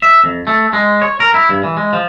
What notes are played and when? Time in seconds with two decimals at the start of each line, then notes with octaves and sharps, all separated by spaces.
0.02 E5
0.24 F2
0.47 A3
0.73 G#3
1.02 C#5
1.20 A#4
1.34 E4
1.49 G2
1.64 E3
1.77 G#3
1.93 F3